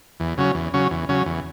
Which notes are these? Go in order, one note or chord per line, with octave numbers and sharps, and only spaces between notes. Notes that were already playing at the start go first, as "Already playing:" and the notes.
E2
C#3 F#3 C#4
E2
C#3 F#3 C#4
E2
C#3 F#3 C#4
E2